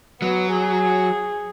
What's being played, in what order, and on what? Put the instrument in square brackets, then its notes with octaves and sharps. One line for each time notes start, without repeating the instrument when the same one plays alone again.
[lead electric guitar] F#3 [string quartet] B3
[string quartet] G#4